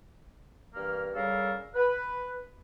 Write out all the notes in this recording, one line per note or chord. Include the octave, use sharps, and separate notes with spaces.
G2 E3 A#3 F6
C#3 G3 A4 A#4 F5
B4